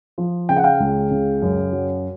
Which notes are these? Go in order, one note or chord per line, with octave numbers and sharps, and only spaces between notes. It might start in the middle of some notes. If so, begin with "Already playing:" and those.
F3
C#3 G5
F#5
F5 G5
C#2
C#3
F#2
F#3